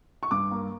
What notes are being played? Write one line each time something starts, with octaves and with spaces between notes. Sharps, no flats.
C#6
G2 D6
A#3